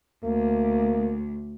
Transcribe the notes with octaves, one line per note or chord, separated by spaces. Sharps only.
D2 A#3